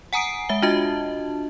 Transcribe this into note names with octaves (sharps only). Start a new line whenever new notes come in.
F#5 G#5 A#5 D#6 C7 D7
G#3 E5 G7
D4 F4 F#4 D#5 A5